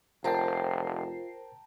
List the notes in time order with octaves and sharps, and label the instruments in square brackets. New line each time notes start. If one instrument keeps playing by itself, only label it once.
[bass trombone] F1 [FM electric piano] F4 C7 [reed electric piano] A#4 C5 [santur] G5 A5 A#5